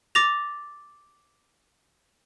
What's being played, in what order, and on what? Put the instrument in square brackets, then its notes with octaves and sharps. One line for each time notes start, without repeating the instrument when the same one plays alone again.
[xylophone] D6 A6 A#6 F7